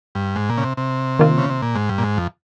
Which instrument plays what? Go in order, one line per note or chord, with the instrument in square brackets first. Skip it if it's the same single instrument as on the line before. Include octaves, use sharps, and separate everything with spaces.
[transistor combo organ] G2
G#2
A#2
C#3
C3
C3
[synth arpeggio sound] D#3 A#3 F4
[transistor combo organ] C#3
C3
A#2
G#2
G2
A#2
G#2
F2